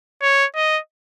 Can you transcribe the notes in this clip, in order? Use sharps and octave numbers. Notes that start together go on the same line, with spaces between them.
C#5
D#5